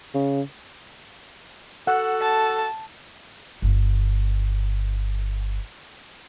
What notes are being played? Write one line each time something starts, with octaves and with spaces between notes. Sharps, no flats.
C#3
F#4 A4 F#5
A5
G1 B3